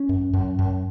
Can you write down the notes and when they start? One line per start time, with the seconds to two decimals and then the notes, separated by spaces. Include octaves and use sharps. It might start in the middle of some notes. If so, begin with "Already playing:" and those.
Already playing: C#4
0.09 F#2
0.33 F#2
0.59 F#2